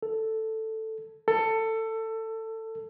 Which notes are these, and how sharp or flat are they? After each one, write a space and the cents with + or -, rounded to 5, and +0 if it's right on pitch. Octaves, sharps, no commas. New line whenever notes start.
A4 +5
A4 +20